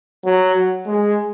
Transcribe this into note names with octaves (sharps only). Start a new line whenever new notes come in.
F#3
G#3